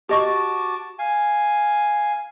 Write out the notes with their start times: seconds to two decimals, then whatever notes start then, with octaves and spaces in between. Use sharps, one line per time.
0.09 F#4 G4 D#5 A5 C#6 D6
0.99 F5 G#5